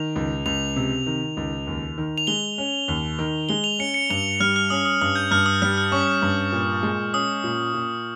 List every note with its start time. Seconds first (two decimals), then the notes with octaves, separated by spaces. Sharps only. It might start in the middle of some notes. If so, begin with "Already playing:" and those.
Already playing: D#3 F7
0.16 C#2
0.46 C#2 F7
0.76 C3
1.06 D#3
1.37 C#2
1.67 D#2
1.98 D#3
2.18 F7
2.27 G#3 G7
2.58 C#4
2.88 D#2
3.19 D#3
3.49 G#3 G7
3.64 F7
3.79 C#4 C#7
3.94 C#7
4.10 G2 F7
4.40 G3 F6
4.56 F6
4.70 C#4 D#6
4.85 D#6
5.01 G2 D#6
5.16 G6
5.31 G2 F6
5.46 D#6
5.62 G3 F6
5.77 F6
5.92 C#4 C#6
6.22 G2
6.52 A#2
6.83 G#3
7.13 C#4 D#6
7.44 A#2
7.74 A#2